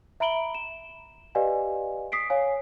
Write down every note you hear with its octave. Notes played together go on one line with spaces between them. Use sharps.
E5 A#5 B5 D7 F#7 G7
E7
G4 B4 D5 D#5 F5 G#5
D#6 B6 C7 D7
C#5 F5 G#5